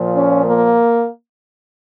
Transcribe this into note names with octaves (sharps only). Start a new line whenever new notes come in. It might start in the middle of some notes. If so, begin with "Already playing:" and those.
Already playing: A#2 F3
C#4
A#3